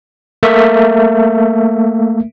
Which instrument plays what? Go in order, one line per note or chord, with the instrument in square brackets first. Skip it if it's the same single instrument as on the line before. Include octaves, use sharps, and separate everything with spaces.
[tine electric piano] A3 A#3 A#4 E5